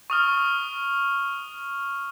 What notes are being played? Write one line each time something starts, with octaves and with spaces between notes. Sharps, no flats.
C#6 D#6 F6